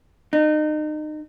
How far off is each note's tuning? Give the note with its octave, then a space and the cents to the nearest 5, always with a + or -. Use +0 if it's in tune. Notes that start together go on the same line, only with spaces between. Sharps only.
D#4 -30